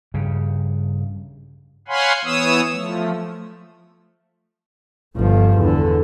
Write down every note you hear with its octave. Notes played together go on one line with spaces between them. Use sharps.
G2 C#3
C#5 F5 F#5 G#5 B5 C6
E3 B3 C#5 D#6 E6
F3 A3
G1 F3
E2 D3